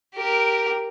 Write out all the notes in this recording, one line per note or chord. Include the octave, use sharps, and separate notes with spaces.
G4 A#4